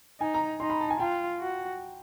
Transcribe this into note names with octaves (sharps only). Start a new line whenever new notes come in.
D#4 G#5
A#5
D#4 C6
B5
A5
G#5
F4 G5
F#4